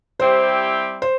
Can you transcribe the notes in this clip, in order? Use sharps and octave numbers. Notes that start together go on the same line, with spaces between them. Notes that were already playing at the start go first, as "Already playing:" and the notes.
G3 C4 E4 G4 C5
C5